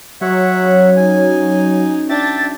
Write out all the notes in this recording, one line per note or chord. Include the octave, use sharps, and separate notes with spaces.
F#3 G#3 D#4 F#4 C#5 E5 F#5
F#2 C#3
C#3 D#4 G#5
D4 E5 G5 A6